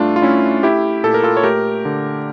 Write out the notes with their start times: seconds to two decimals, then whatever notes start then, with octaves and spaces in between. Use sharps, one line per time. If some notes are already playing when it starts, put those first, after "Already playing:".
Already playing: G2 A3 D4 F4
0.16 F4
0.22 A3 C#4 E4
0.63 A3 E4 G4
1.04 A#2 A4
1.14 A#4
1.23 F4 A4
1.37 C#5
1.43 A3 G4 A#4
1.85 D3